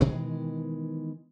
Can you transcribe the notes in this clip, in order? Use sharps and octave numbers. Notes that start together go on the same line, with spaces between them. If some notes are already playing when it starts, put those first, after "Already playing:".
B2 D#3 E3 G#3